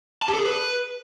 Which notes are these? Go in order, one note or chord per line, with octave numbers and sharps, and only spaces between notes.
A5
G4
A4
G#4
B4